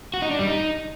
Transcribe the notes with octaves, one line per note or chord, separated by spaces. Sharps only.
F#4
D#4
D4
G3
D#4